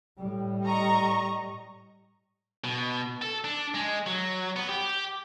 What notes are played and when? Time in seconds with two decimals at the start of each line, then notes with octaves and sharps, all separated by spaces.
0.19 A2 G3
0.63 D#5 A#5 C#6
2.64 B2
3.22 A4
3.44 D4
3.75 G#3
4.07 F#3
4.56 B3
4.69 G4